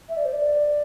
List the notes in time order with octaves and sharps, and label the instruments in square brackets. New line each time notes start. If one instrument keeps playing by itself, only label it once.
[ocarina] E5
D5
C5
D5